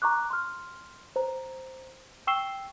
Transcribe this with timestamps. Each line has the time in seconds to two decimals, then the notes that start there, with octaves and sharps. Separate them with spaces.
0.02 A#5 C#6 D6 F#6
0.30 C6 F6
1.16 C5 A#5
2.27 G5 C#6 E6 C7 E7 G7